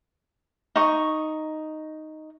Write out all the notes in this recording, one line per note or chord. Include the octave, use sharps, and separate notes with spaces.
D#4 C#6